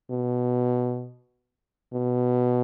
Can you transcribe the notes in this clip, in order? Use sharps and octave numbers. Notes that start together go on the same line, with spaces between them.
B2
B2